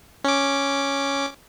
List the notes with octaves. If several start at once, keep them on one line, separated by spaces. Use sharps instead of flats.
C#4 D6